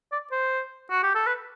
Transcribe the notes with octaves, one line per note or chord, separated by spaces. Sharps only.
D5
C5
F#4
G4
A4
B4